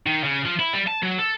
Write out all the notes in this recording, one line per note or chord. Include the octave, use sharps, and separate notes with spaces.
D#3
C#3
F3
E4
G3
A5
F#3
A4